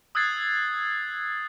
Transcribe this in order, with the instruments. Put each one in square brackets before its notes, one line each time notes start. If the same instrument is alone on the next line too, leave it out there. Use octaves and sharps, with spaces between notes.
[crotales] D#6 E6 F#6 G#6 A6 C7